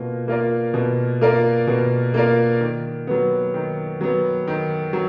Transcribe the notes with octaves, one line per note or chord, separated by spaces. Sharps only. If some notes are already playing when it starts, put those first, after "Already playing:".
Already playing: B2 A#3 F4
A#3 F4 A#4 D5
B2
A#3 F4 A#4 D5
B2
A#3 F4 A#4 D5
D#3
F#3 B3
D#3
F#3 B3
D#3
F#3